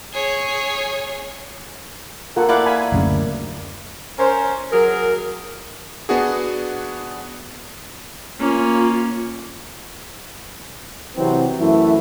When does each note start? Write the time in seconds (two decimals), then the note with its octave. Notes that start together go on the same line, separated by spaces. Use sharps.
0.13 G#4 C#5
2.36 A#3 F4 A4 F#5
2.49 E4 D5 F5 F#5
2.66 G#5 B5
2.92 F#1 D2 C#3
4.19 C#4 A#4 C5
4.72 F#3 G#4 A#4
6.09 B3 D4 F#4 G#4
8.40 A#3 C#4 F4
11.17 C3 E3 F#3 C4
11.58 F#2 E3 A3 E4